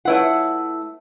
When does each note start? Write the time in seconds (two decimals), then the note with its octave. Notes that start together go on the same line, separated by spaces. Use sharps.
0.05 A3 E4 F4 B4 C#5 F#5